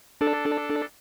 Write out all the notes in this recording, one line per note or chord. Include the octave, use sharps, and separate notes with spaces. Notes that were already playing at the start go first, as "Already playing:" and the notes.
D4 A4